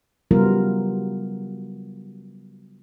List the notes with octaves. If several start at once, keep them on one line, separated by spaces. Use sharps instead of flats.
C#3 F#3 G3 B3 F4 A#4